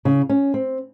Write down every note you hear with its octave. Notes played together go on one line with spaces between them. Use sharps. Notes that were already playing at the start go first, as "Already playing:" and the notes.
C#3
C#4
C4